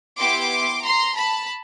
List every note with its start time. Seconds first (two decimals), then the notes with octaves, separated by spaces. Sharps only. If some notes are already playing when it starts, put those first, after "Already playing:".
0.18 B3 E4 G4 C6 D6
0.83 A#5 C6
1.16 A5 B5